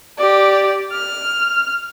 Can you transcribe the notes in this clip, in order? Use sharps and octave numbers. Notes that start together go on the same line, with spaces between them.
G4 D5
F6